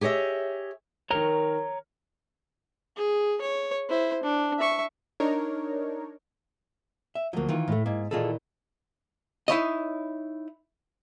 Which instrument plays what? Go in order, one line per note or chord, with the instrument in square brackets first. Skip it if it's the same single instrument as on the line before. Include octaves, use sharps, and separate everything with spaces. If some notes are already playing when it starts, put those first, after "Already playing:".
[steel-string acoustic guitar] G4 G#4 C#5 D#5 E5
[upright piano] D#3 A#4 [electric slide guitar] C#5 A#5
[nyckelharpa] G#4
C#5
E4 C5
D4
E5 C#6
[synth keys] D4 D#4 A#4 C#5
[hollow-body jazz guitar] E5
[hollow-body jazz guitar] D2 F3 [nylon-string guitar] F#3 A#3
[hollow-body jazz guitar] D#3 E3 F4
[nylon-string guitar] A2 A3
[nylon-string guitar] G#2 [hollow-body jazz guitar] A#3
[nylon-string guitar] A#2 D#3 E3 [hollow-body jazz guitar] F4 G#4 A4
[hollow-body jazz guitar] D#4 E4 C#5 D#5